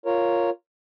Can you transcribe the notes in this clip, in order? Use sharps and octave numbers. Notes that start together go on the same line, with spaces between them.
F4 A#4 C#5